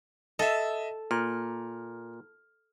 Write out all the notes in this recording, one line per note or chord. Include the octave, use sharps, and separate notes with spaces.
A4 D#5 E5
A#2 F6